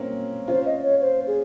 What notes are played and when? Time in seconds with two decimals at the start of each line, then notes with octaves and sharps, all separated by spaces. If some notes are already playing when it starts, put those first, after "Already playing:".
Already playing: A#3 C4 C#4
0.48 C#4 F4 C5
0.66 D#5
0.83 C#5
1.01 C5
1.27 G#4